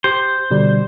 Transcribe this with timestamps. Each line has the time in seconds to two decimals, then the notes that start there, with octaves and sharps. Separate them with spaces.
0.04 G4 C5
0.51 B2 D3 G3